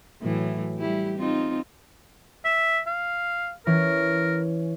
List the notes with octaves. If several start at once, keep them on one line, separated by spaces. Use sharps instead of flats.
A2 E3 F#3
G3 E4 G4
C4 D#4 F4
E5 E7
F5
E3 C#4 A#4